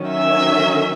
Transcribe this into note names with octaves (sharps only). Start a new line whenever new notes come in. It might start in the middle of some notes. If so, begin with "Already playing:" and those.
Already playing: D#3 F#3 C#4
E5